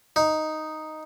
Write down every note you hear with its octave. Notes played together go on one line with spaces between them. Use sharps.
D#4